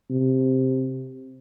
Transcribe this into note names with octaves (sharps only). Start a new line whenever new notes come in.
C3